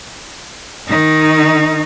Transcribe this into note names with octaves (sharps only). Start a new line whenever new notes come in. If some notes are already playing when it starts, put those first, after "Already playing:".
D#3 D#4